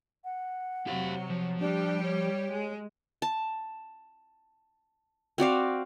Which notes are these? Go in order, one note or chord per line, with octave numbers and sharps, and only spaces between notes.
F#5
C3 F#3 G4 F5
F3
G3 D4 G4
C#5
G#3
A5
C4 F#4 D5 F5